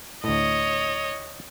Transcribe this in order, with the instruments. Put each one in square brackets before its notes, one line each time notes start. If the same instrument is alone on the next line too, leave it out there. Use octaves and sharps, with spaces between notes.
[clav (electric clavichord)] D2 A2 [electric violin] C#5 D#5